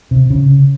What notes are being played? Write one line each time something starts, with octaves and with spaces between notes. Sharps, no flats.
C3
C#3